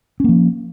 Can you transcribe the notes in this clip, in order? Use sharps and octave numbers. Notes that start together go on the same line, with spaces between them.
F3 A#3 C#4